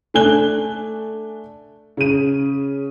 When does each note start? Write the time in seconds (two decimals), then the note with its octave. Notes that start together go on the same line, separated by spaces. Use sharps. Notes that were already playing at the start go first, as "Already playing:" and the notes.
0.14 A3 D4 G#5 F#6 G7
1.97 C#3 D#7